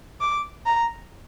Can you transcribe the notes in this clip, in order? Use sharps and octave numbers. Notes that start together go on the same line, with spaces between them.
D6
A#5